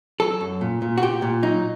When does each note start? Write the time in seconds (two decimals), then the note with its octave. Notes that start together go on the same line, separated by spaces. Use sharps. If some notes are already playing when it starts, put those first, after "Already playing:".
0.20 F#3 A4
0.41 F#2
0.61 A#2
0.82 A#2
0.98 F#4
1.02 A#2 G4
1.22 A#2
1.43 F#3 D#4